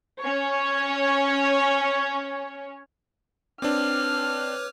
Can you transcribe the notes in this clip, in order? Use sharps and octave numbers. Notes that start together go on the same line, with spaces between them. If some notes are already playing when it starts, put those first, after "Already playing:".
C#4 C#5
C4 D4 B4 C#5 D6 F6